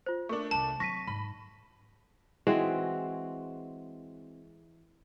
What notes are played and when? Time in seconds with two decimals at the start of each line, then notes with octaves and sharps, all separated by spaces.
0.06 F4 C5
0.29 A3 D4 A#4 C#6
0.51 C2 D3 A5
0.80 F#3 C4 C#6 A#6 B6 D#7
1.07 G#2 B5
2.47 E3 G#3 C4 F#4